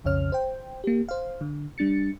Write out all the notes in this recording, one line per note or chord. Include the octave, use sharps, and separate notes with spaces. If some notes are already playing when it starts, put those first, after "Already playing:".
B1 F2 C#3 C#5 F6
C5 G5
A#3 G4
C5 F5
D3
G3 D4 A6 C#7